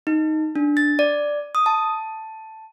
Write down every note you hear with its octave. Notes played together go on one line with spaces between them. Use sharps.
D#4
D4
A6
D5
D#6
A5